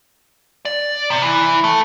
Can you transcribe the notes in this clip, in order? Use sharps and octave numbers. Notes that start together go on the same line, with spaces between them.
D5
C3
E3
A3